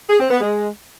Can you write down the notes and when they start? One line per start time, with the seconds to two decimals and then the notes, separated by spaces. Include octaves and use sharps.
0.10 G#4
0.20 C4
0.30 B3
0.40 G#3